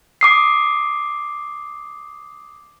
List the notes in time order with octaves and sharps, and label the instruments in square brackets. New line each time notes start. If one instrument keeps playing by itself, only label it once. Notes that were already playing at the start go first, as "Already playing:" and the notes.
[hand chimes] D6 D#6 C7